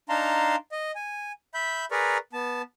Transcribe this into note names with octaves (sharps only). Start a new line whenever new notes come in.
D4 D#4 F5 A5 A#5 C6
D#5
G#5
E5 B5 G6
G#4 A#4 B4 D5 A#5 C#6
B3 A5